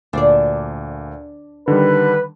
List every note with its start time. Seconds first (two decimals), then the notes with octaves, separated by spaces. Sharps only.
0.13 D2 A#2 D4 C5 D5
1.68 D3 D#3 G3 B4